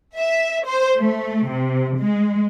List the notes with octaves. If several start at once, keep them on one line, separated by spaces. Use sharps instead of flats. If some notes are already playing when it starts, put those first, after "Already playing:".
E5
C5
A3
C3
G#3